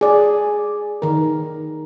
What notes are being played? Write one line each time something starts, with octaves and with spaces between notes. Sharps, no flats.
G#4 D5
D#3 A#4